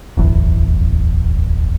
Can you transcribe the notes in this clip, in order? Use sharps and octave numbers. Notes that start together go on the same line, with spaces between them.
D1 G1 E2